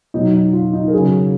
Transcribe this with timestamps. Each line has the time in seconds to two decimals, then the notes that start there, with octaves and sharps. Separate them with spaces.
0.14 B2 F#3 D#4
0.34 D#4
0.53 F4
0.73 D#4
0.88 A#4
0.93 C#3 F#3 G#4